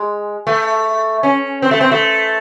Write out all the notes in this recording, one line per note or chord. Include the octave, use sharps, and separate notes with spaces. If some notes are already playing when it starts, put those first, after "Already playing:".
Already playing: G#3
A3
C#4
C4
A3
C4
A3